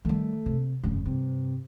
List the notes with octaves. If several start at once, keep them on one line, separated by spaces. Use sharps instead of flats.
D#3 G3 A3
C3
F1 G2 C#3
G2 C3